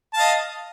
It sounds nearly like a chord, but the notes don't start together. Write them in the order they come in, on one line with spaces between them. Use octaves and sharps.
A5 F5 D#5